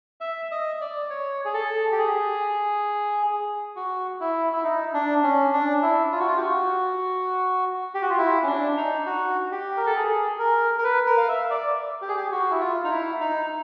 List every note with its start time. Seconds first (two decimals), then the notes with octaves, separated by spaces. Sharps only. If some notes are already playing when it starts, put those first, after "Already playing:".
0.21 E5
0.51 D#5
0.81 D5
1.10 C#5
1.45 G#4
1.54 A4
1.92 G4
1.98 G#4
3.76 F#4
4.20 E4
4.53 E4
4.64 D#4
4.94 D4
5.23 C#4
5.53 D4
5.82 E4
6.12 F4
6.20 F#4
6.27 F4
6.37 G4
6.41 F#4
7.94 G4
8.02 F#4
8.10 F4
8.18 E4
8.43 C#4
8.47 D4
8.77 D#4
9.06 F#4
9.52 G4
9.77 A#4
9.86 A4
9.96 G#4
10.39 A#4
10.78 A#4
10.84 B4
11.06 A#4
11.17 F5
11.28 E5
11.50 D5
12.02 G4
12.08 G#4
12.17 G4
12.32 F#4
12.51 E4
12.61 F4
12.84 D#4
12.90 E4
13.20 D#4